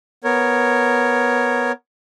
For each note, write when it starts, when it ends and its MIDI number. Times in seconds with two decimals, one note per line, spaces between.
0.24 1.72 59
0.24 1.72 70
0.24 1.72 73